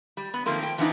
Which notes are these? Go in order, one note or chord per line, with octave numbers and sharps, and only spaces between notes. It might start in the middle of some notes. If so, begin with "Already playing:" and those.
G3
B3
D#3 F3 A3 A#3 C4
G5
E3 F3 B3 D4 D#4